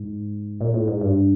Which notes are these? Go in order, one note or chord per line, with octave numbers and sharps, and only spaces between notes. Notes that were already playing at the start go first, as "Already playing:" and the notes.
Already playing: G#2
A#2
A2
G#2
G2